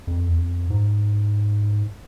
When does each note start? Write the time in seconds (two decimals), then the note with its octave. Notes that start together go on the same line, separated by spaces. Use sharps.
0.07 F2
0.27 E2
0.38 F2
0.70 G#2